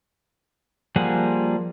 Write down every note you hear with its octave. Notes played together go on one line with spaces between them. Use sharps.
F3 G3 A#3 G#4 F#5